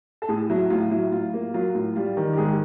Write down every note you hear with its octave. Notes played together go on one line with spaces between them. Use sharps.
A4
A2 G#4
F#3 E4
A2 F4
F#3 E4
A2 F4
A#3
F#3 F4
A2
G3 F4
D#3
G4
G#2 G#4